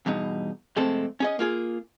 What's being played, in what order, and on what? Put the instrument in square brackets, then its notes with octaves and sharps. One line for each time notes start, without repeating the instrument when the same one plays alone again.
[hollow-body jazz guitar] E2 G2 B2 D#4
F2 C3 G#3 A3 C4 A4
C#4 G#4 D#5
A#3 F4 G#4